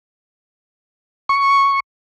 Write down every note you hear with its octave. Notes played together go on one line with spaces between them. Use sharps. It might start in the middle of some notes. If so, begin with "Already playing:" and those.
C#6